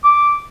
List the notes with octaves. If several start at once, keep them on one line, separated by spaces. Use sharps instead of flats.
D6